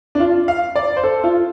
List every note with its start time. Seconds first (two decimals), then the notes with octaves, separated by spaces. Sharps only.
0.15 D4
0.20 F4
0.48 F5
0.76 D5
0.97 C5
1.04 A4
1.24 F4